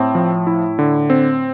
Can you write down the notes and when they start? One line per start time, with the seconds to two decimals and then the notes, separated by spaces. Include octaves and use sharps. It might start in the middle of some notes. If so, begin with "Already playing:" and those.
Already playing: A2 C4
0.15 F3
0.47 E4
0.79 D3
1.10 C4